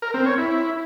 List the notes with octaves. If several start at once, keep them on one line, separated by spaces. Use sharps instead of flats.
A#4
C4
C#5
E4